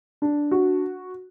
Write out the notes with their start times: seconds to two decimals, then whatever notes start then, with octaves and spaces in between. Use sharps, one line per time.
0.22 D4
0.51 F#4